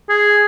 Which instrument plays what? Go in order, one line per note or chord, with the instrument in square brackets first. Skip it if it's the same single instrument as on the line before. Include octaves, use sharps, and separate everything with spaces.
[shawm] G#4